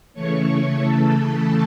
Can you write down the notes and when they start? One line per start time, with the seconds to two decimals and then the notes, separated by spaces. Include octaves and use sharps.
0.14 C#3 E3 A3 C#5 C#6
0.48 C#5 C#6
0.83 C#3 E3 A3 A4 A5
1.18 A4 A5